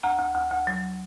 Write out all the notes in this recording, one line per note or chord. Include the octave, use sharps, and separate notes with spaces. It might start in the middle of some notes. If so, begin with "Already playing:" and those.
D2 A#5
D2
D2
D2
F#3